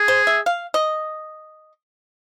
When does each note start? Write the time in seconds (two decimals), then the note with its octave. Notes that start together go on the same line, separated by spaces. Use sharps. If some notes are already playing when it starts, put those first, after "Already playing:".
Already playing: G#4
0.08 C5
0.27 E5
0.46 F5
0.74 D#5